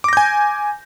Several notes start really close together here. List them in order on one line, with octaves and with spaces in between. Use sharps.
D6 A#6 G6 G#5